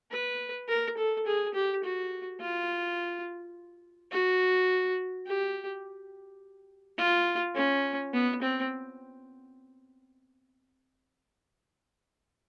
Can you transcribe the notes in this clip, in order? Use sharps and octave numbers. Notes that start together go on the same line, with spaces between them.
B4
A#4
A4
G#4
G4
F#4
F4
F#4
G4
F4
C#4
B3
C4